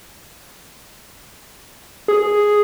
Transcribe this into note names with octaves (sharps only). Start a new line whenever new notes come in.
G#4